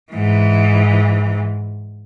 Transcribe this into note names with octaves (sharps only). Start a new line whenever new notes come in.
G#2 E3